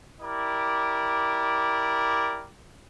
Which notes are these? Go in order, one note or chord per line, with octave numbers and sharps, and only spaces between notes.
E4 G4 A#4 D5